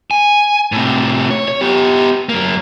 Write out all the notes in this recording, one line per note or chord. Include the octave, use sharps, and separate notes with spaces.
G#5
A2 C3
C#5
C#5
B3 G4
F#2 A#3